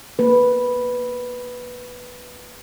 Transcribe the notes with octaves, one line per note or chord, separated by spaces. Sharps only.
A#3 B4